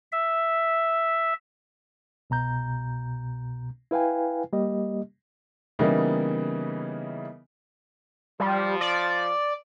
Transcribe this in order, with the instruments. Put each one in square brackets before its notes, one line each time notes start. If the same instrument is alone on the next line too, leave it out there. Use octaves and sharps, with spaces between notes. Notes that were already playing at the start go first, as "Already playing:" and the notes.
[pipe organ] E5
[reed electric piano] C2 B2 A#5 G6
E4 B4 F5 G5 G#5
G3 A#3 G4 D#5
[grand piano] C#3 E3 G3 A#3 B3 D#4
[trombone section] F3 [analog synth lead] G3
[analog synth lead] D5